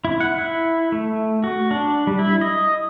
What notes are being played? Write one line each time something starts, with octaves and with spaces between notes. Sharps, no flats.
E4
F#5
E4
A3
F#4
D4
G3
E4
D#5